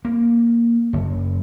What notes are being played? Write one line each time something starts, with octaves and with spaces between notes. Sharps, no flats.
A#3
F#1